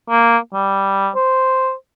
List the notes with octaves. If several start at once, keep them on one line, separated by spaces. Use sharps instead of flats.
A#3
G3
C5